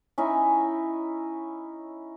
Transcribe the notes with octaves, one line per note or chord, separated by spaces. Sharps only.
C#4 D#4 E4 D#5